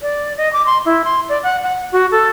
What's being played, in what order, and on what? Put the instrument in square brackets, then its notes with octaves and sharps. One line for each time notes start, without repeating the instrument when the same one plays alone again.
[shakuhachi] D5
D#5
D6
C6
E4
C6
D5
F#5
F#5
F#4
A4